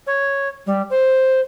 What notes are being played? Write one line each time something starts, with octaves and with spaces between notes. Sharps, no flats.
C#5
G3
C5